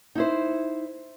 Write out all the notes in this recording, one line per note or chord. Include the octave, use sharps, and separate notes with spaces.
D#4 E4 C5